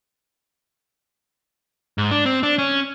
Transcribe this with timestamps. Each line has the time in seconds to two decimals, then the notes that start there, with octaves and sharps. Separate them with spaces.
1.98 G#2
2.11 D4
2.26 C4
2.43 D4
2.58 C#4